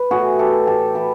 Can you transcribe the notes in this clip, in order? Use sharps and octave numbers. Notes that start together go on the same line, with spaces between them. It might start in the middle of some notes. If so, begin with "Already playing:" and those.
Already playing: B4
A2 F#4 G#4
E3 G4 A4
A2 G4 A4
E3 A4 B4